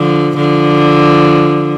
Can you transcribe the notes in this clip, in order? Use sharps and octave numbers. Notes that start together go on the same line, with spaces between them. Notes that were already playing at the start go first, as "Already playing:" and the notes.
Already playing: D3 F3
D3 F3